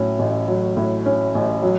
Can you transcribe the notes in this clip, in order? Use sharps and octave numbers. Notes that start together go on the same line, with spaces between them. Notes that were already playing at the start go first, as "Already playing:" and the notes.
Already playing: A2 F#3 C#4
A1
F#3
A2
C#4
A1
F#3